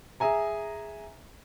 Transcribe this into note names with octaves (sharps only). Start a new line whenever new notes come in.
G#4 E5 G#5 A#5